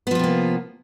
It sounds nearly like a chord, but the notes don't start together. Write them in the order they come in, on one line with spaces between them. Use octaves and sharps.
B3 F3 F4 C3 A#3